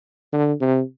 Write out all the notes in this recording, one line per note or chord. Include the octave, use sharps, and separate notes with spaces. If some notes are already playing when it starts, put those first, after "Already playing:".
D3
C3